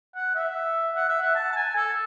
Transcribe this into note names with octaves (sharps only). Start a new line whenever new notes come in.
F#5
E5
F#5
E5
F#5
A5
A5
G#5
A4